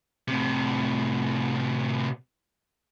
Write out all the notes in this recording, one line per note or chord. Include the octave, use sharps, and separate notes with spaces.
A2 C3